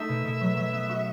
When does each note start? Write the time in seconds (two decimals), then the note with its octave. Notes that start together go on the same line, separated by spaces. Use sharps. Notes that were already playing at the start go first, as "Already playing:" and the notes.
Already playing: A3 D#4 E5
0.09 B2
0.25 B2
0.41 F#3
0.57 F#3
0.73 B3
0.89 F#4